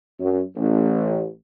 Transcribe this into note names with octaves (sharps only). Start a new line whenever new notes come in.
F#2
A1